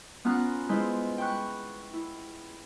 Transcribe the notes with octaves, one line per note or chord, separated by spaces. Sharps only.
B3 C#4 F4 A#5 F#6
G#3 E4 F4 B4 C5
G5 B5 C#6 F#6
E4